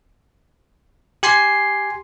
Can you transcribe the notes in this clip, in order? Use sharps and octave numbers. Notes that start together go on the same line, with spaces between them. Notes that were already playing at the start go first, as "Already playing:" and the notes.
G4 G#5 C6 C7